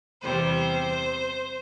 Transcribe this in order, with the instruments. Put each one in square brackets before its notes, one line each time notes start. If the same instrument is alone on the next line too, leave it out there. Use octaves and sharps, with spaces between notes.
[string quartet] E2 C3 G3 C5